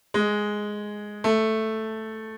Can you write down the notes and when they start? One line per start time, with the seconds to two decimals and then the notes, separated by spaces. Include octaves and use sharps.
0.14 G#3
1.24 A3